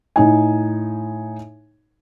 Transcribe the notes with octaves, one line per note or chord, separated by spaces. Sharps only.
A2 D#4 G#5